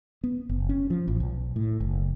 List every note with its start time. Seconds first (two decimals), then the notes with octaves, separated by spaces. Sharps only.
0.24 B3
0.49 F#1
0.69 C#4
0.90 F3
1.08 A1
1.20 B1
1.56 A2
1.80 F#1